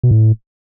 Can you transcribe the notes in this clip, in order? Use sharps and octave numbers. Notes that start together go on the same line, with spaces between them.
B2
A2